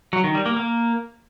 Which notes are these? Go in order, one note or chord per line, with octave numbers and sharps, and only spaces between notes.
F#3
D#3
G3
A#3
A#3